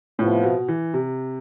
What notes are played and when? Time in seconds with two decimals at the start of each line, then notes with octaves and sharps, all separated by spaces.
0.19 A2 C3 F3 B3 F4
0.43 B2
0.68 E3
0.94 C3